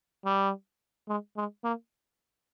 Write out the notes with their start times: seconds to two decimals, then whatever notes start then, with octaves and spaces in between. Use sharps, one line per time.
0.25 G3
1.08 G#3
1.37 G#3
1.64 A#3